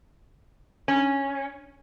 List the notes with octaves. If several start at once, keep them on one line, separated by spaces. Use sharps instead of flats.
C#4